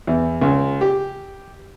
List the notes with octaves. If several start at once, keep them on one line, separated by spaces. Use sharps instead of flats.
E2
C#2
G4